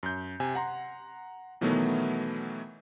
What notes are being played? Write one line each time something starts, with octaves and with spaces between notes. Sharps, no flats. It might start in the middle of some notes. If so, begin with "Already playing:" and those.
F#2 G6
C3 G#5
F#5 A#5 C6
B2 D#3 E3 F#3 A3 B3